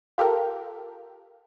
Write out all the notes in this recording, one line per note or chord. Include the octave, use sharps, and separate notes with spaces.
F4 G4 A4 A#4